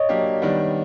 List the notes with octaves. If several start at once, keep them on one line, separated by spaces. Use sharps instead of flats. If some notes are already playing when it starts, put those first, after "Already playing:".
Already playing: C#5 D#5
F#3 A#3 D4 G4
D#3 G3 B3 D4